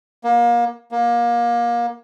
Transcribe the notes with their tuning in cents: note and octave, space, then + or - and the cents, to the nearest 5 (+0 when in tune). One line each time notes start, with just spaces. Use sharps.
A#3 +30
A#3 +25